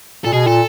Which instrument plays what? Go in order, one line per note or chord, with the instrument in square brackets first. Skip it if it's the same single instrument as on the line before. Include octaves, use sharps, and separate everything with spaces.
[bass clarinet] A#2 [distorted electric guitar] A4
[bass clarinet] B2 [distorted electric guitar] G#4
[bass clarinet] A#2 [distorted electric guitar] A4